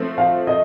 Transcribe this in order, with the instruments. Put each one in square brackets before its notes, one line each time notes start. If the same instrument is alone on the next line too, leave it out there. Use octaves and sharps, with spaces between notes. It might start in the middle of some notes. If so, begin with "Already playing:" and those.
Already playing: [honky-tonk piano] F3 A3 C4
[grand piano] F5
D#5